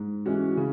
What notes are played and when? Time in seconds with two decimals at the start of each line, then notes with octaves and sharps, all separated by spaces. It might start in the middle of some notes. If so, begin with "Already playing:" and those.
Already playing: G#2
0.26 E3 G#3 C#4 F#4
0.57 C#3